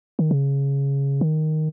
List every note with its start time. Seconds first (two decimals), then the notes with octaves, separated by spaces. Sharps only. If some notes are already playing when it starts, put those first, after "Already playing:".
0.19 D#3
0.31 C#3
1.21 D#3